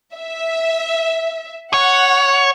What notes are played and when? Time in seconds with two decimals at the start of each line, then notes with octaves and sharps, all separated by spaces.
0.15 E5
1.74 C#5 F#5